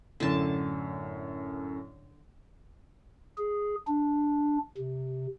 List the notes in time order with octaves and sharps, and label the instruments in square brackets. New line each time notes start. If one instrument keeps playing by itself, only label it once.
[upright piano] F#2 A2 [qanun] D3 A5
[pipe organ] G#4
D4
C3